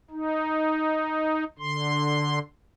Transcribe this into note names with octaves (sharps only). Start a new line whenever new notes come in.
D#4
D3 C6